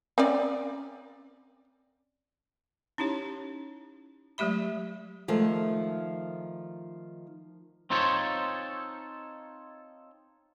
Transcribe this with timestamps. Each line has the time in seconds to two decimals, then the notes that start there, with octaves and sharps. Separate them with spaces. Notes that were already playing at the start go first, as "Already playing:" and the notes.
0.18 C4 C#4 D5
2.98 C#4 D#4 E4 G4 C#5
4.38 F#3 G#3 A3 G4 E5 B5
5.28 D#3 F3 G#3 A3
7.90 C4 D#4 F4 A4 C5 C#5